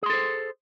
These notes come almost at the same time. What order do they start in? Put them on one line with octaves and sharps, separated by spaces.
G#4 C6 A4 C5